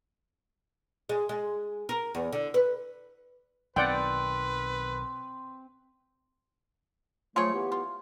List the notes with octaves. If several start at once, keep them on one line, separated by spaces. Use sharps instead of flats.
G#3
G#3
A#4
E2
D3
B4
B1 D#3 C4 B4 D5 F#5 G5
F3 F#3 A3 F4 G#4 C#5
E3 B3 G4
F4